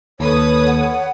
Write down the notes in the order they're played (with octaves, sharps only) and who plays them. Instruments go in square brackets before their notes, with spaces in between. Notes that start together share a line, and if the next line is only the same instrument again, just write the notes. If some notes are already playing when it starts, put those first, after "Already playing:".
[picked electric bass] D#2 [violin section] A4 B4 D#6 [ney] C#5
[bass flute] F#5